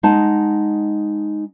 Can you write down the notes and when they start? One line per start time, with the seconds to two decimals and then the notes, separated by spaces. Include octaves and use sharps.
0.03 G#3 D#4 F#5 A5